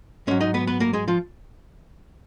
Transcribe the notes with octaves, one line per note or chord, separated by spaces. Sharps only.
G#2 F#3 C#4 C#5
D#4 D#5
B3 B4
B3 B4
A#3 A#4
G#3 G#4
F3 F4